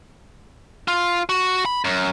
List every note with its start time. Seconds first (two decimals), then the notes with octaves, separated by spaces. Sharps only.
0.88 F4
1.29 F#4
1.65 B5
1.84 F#2